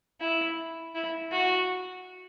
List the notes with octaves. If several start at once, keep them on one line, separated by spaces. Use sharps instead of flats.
E4
E4
F#4